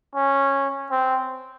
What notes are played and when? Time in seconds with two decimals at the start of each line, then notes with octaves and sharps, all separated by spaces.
0.15 C#4
0.91 C4